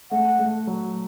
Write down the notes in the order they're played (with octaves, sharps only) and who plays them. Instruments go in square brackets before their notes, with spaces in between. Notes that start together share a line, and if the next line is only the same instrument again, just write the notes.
[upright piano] A3 [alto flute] F#5
[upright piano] A3
F#3